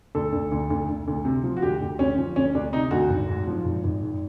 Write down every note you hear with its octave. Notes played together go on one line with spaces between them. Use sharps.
D2 A4
D2
D2
D2
D2
D2
C3
F3
F#4
D2 G4
D2
D2 C#4
F3
D2 C#4
D2 D4
C3 D#4
D2 F#4
G#1
G#2
F3
G#1
G#1
G#2